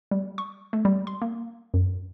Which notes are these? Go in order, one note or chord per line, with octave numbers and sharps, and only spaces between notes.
G3
C#6
A3
G3
C6
A#3
F#2